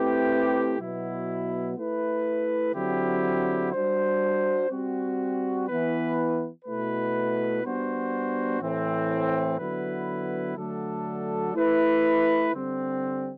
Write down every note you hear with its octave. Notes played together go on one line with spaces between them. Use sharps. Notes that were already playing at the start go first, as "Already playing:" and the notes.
Already playing: A3 C4 E4 G4 B4
B2 F#3 B3 E4
A3 E4 B4
D3 F#3 C4 E4 G4
G3 D4 F#4 C5
G3 C4 F#4
E3 B3 E4 B4
B2 A3 E4 B4
G3 B3 D4 F#4 C5
A2 E3 A3 C4
D3 F#3 B3 E4 B4
D3 F#3 A3 D4 A4
A3 E4 B4
D3 G3 C4